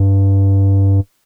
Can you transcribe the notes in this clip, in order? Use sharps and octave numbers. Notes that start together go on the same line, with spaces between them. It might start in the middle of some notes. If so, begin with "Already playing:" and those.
Already playing: G2